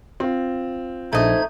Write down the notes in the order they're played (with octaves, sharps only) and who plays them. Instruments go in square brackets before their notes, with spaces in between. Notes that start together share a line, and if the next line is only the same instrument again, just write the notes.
[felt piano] C4 F4
[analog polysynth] A#1 [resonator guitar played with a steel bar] A3 D#5 [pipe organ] D#4 C5 G#6